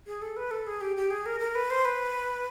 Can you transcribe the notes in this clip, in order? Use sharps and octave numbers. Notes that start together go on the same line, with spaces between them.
G#4
A4
B4
A4
G#4
G4
G4
G#4
A#4
A#4
B4
C5
B4